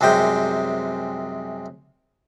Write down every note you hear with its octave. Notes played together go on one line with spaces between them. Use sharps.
C2 F#2 C3 G#3 G5